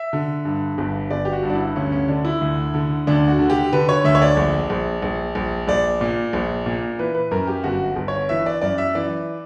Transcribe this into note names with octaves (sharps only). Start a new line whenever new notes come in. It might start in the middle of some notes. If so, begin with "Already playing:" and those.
Already playing: E5
D3
G2
G1
G1 D5
G4
F#4
G2
D4
E4
D2 C#4
C#4
D3 D4
E4
D2
D3
D2 D4
F#4
D3
G4
D3 B4
C#5
D2 E5
C#5
D5
A#1
A#1
A#1
A#1
A#1 D5
A#2
A#1
A#2
E3 B4
B4
F#2 A#4
G4
G1 F#4
G1
C#5
E3 E5
D5
F#2 D5
E5
E3 D5